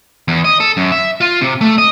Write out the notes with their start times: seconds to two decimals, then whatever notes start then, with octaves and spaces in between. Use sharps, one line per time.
0.28 E2
0.44 D#5
0.60 A4
0.77 F#2
0.92 E5
1.21 F4
1.41 C3
1.61 A3
1.78 D#5